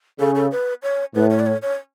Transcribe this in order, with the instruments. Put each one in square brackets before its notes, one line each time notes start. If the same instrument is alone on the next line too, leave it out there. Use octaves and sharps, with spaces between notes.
[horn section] C#3 [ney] A4
[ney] A4
B4
C#5
[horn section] A2 [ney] B4
[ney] C#5
D5
C#5
C#5